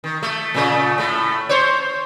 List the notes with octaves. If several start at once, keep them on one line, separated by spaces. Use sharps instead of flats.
D#3
A3
A#2 C#3 A3
A2 A3
C5 C#5